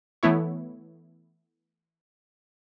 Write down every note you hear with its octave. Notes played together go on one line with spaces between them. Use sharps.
E3 A3 B3 E4 C#5